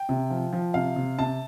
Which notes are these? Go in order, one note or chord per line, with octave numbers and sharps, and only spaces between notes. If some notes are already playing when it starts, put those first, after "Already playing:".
Already playing: G5
C3
F3
F3
C3 F5
C3
C3 A5